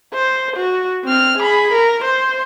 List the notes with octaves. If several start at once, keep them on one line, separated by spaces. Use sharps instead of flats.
C5
F#4
C4 F6
G#4 B5
A#4
C5